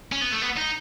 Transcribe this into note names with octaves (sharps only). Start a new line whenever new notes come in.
C#4
B3
A3
B3
D#4